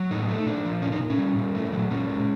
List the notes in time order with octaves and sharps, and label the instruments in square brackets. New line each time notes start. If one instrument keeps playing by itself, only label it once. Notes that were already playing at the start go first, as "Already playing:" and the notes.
Already playing: [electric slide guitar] F#3
A2 D#4
A3
A#2 D4
F3
A#2 C#4
D#4
A#2
C#4
G3
A#2
A3
F#3
A#2 C#4
G#3